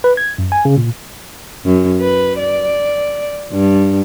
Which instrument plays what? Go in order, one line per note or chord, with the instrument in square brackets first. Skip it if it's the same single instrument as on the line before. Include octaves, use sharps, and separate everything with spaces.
[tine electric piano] B4
G#6
F#2
G#5
C#3
A#2
[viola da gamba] F#2
B4
D5
G2